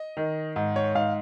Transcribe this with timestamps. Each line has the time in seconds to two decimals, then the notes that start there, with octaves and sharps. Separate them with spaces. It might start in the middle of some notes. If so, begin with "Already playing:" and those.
Already playing: D#5
0.17 D#3
0.56 G#2
0.76 C#5
0.95 G#2 F5